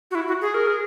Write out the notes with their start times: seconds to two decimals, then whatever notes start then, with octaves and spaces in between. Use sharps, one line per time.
0.11 F#4
0.15 E4
0.28 F#4
0.41 G#4
0.54 A#4
0.67 G#4